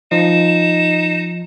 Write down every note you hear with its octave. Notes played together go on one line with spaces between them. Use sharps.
F3 D#4 E7